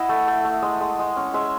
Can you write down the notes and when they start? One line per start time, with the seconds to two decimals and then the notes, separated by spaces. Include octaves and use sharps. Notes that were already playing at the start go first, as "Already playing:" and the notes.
Already playing: E4 D#5 F#5
0.09 A3
0.28 A3
0.45 A3
0.62 G#3 D#5
0.81 G#3
0.99 G#3
1.16 C#4
1.34 G#3 E5